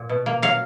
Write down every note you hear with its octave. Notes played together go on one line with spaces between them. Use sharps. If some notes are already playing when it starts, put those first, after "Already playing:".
Already playing: A#2
B2
A#3
F#3 F5